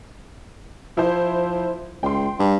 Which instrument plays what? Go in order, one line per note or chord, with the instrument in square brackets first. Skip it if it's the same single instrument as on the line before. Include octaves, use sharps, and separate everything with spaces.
[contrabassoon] F3 [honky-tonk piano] E4 C5
[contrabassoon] C#2 [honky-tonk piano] G5 C6
[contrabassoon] G2